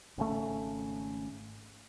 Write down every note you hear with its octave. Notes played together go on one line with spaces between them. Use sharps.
G#1 C#3 A3